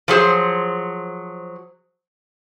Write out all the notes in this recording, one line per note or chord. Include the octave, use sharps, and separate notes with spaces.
F3 F#3 G#4 C5